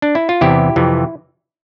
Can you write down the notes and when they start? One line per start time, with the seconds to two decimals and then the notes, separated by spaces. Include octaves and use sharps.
0.02 D4
0.15 E4
0.29 F4
0.41 E2 C3 E3 E4 G4
0.76 F2 C3 E3